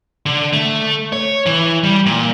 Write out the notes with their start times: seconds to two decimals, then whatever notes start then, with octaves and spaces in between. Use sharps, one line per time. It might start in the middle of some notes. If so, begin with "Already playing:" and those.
0.26 D3
0.53 A3
1.13 C#5
1.46 E3
1.83 G3
2.06 A#2